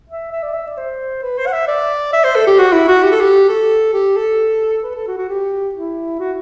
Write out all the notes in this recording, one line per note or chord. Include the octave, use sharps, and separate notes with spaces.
E5
E5
D5
E5
D5
C5
B4
C5
F#5
E5
D5
E5
C5
A4
G4
F#4
E4
F#4
G4
A4
G4
A4
G4
A4
B4
A4
F#4
F#4
G4
E4
F#4